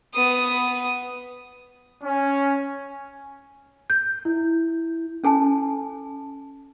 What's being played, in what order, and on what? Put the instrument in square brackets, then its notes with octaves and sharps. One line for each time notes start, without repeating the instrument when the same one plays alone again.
[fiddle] B3 D#6
[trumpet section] C#4
[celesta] G6
E4
[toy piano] C#4 A4 G#5 A5